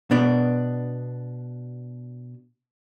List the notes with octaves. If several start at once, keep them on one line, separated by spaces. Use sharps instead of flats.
B2 B3 D4